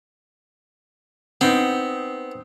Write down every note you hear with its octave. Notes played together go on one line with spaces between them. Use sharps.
B3 C4 D#4